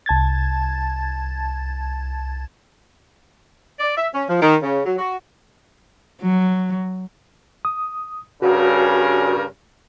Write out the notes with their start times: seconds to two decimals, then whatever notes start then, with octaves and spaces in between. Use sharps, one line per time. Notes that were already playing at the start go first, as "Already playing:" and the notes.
0.06 C2 A5 G#6 A6
3.80 D5
3.97 E5
4.13 C#4
4.29 F3
4.42 D#3
4.63 C#3
4.85 F#3
4.98 F#4
6.21 F#3
7.65 D#6
8.42 G2 C#3 F#4 A#4